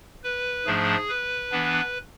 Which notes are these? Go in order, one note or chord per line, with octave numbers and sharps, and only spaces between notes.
B4
G#2 F3 A3 D4 G#4
B4
E3 B3 D4